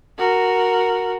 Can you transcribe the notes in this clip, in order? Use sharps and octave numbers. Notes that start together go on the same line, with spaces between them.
F#4 A#4